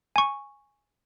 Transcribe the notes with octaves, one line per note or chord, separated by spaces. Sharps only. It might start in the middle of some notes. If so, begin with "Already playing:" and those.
G#5 C#6